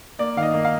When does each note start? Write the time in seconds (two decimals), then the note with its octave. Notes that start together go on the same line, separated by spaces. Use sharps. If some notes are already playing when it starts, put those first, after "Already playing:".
0.19 A#3 D5
0.36 D#3 F5
0.42 D#5
0.54 A#3
0.65 F5